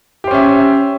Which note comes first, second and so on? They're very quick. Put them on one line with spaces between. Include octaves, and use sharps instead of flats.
G4 C5 C#4 E5